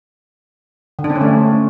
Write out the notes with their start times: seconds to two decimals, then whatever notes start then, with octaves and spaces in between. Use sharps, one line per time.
0.99 D3
1.04 D4
1.10 C4
1.16 C#4
1.21 A3